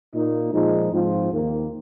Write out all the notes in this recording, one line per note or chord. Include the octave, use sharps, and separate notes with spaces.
A#2 A#3 D#4
A#2 F3 G#3 D#4
G#2 F3 C4 F4
D#2 D#3 A#3